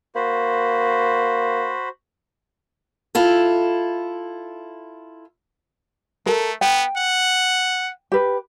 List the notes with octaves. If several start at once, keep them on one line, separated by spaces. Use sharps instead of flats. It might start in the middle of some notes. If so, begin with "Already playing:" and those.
A#3 F#4 C5 B5
E4 F4 A4
A3 A4 A#4
B3 G5
F#5
G4 B4